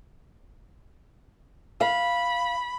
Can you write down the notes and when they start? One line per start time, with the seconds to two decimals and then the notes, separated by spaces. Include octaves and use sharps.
1.81 F5 B5